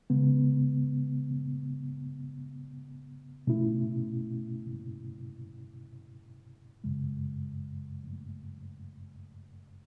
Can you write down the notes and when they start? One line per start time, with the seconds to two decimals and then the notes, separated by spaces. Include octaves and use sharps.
0.10 C#3 G#3 B3
3.47 B2 A3 C#4 E4
6.84 F#2 C#3 G#3